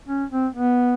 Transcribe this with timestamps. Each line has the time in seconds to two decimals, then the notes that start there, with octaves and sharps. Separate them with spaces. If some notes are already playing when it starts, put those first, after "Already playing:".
0.08 C#4
0.31 C4
0.55 B3